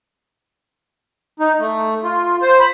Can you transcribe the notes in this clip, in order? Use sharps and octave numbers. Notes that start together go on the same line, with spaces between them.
D#4
A3
F4
C5
B5